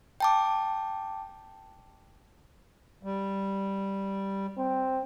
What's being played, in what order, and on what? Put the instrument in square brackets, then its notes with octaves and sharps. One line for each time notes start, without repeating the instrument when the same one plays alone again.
[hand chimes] G5 A5 D6
[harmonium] G3
[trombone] C4